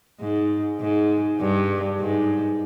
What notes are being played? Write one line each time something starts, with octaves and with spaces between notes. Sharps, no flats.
G#2
G#2
G2
G#2